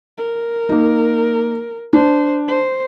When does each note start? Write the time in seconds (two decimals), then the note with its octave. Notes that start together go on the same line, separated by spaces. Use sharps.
0.18 A#4
0.69 A#3 D#4
1.93 D4 C5
2.48 C5